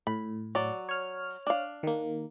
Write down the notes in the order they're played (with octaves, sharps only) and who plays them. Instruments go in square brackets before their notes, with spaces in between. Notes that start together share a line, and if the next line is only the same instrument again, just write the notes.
[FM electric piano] A2 [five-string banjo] B5
[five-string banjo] F#3 D5
[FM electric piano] C#5 F6
[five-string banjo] D4 F5
[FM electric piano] D#3 A#3